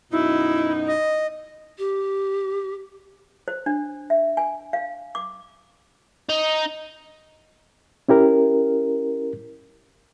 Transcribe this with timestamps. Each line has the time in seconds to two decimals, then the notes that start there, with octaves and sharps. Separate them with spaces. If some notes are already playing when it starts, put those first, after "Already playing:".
0.12 F#2 B2 D#4 E4
0.87 D#5
1.78 G4
3.48 C5
3.66 D4
4.10 E5
4.37 G#5
4.73 F5
5.15 D6
6.29 D#4
8.09 C#4 E4 G4 A#4